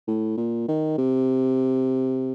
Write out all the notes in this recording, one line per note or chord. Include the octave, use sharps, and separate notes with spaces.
A2
A#2
D#3
C3